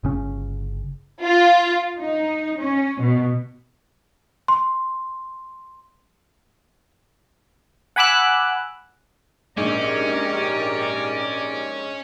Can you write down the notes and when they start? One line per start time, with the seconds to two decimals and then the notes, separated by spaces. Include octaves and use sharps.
0.03 G1 C#3 C#4
1.22 F4
1.99 D#4
2.59 C#4
3.01 B2
4.48 C6
7.96 F#5 G#5 B5 D6 E6 F#6
9.57 A#1 G#2 C#4 G4 A#4 D5